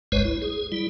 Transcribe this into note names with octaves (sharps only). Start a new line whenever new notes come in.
G#1 C#2 G2 G#3 B4 C#5
E4
G#4
G3 E4